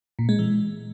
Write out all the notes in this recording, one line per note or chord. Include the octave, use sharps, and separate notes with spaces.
A#2
G#3
E3